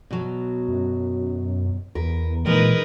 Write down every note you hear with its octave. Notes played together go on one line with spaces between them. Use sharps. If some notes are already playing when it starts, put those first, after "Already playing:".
B2 F#3
F#2
E2 A#4 B4
A#2 E3 G#3 D#4 A#4 B4